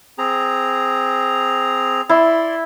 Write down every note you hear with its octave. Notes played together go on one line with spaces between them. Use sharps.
C4 G#4 A#5
E4 D5 C6